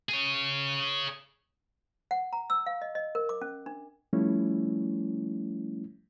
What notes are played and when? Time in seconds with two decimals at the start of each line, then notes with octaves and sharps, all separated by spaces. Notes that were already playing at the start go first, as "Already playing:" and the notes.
0.09 G#4 C#5
2.11 F#5
2.33 A#5
2.50 E6
2.66 F5
2.82 D#5
2.95 D#5
3.15 A#4
3.29 D6
3.42 C#4
3.66 D4
4.13 F3 G3 A3 C#4 E4